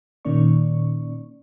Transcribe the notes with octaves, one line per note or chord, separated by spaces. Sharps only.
A#2 D#3 A#3 C#4 D5 C#6